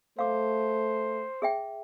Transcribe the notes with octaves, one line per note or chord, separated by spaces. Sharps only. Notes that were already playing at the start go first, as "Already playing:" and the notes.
A3 C5 F5 D6
G#4 E5 G5